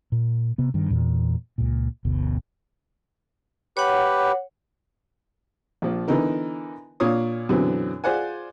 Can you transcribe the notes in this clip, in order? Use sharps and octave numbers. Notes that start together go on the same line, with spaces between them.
A#2
C3 B3
G2 D#3
E2 A#2 E3
C#2 A#2
G1 D2 B2
G4 B4 C#5 F#5
A#1 F3
D3 E3 B3 D#4 A#4
A#2 D4 F4 C#5 F5 D#6
F#2 B2 D3 E3 C4
F4 G#4 C5 D5 F#5 G#5